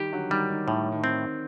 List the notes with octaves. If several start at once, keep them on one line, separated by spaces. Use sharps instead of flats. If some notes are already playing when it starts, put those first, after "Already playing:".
Already playing: D#3 G3 G4
D3 F#3
D#3 G3
D#3
A2 D#3
D#3
C4